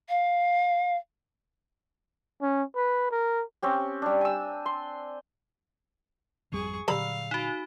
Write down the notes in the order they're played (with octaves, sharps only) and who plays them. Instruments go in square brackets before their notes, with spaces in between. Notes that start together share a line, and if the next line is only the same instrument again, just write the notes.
[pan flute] F5
[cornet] C#4
B4
A#4
[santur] C4 C#4 G4
G3 D4
G#5 E6
C6
[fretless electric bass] G#1 F2 G3 [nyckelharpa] G#4 C#6
[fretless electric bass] A#2 D3 F#3 [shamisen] G3 A#5 B5 [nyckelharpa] F5 [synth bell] E6
[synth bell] D#4 F#4